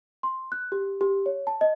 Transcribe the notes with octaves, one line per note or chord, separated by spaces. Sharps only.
C6
F#6
G4
G4
C#5
A5
D#5